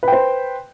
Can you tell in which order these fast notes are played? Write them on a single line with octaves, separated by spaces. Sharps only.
B4 G5 C5